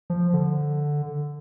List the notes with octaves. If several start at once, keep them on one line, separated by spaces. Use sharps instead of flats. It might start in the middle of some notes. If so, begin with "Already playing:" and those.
F3
D3